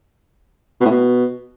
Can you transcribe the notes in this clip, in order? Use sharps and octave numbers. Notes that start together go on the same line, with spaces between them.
B2
A2
B2